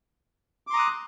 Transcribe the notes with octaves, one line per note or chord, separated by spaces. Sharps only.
A#5 C6 D6 D#6 F#6